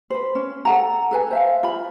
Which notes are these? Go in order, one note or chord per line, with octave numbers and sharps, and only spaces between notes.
B4 C5
C#4
A4 F#5 A#5
A4 B4 G#5
C5 E5 F5
F4 A#5 B5